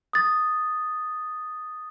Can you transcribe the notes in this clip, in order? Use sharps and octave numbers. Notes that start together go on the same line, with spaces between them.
D#6 A6